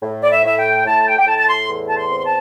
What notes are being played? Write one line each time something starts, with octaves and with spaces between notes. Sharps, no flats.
A2
D5
E5
A2 E5
G5
A2 A5
G5
G5
A2 A5
A5
C6
E2
A5
C6
C4
C6
A5